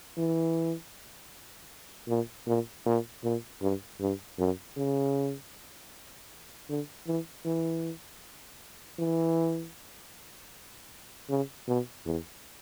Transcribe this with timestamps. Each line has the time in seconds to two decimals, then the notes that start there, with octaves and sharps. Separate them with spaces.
0.17 E3
2.08 A#2
2.47 A#2
2.86 A#2
3.24 A#2
3.62 G2
4.00 G2
4.39 F#2
4.77 C#3
6.69 D3
7.07 E3
7.45 E3
8.99 E3
11.29 C#3
11.68 B2
12.06 E2